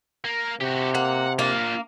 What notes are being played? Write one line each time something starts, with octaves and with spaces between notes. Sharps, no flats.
A#3
C3 F#4 G4
A#3 F#5
A#3 D4 F4